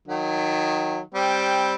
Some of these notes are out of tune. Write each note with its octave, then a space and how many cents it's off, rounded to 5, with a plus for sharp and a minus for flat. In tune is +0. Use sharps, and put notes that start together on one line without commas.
D#3 +0 F#3 -25
G3 +0 C4 +5